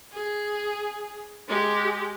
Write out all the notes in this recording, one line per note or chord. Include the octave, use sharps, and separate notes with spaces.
G#4
G#3 G4